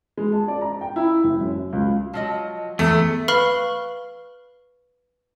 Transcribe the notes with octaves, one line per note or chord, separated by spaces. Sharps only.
G#3
A5
D5
A#5
G5
E4
F#1
F#2
C#2
F3 F#3 D#5
E2 A3
B4 F5 B5 C#6 F6 G7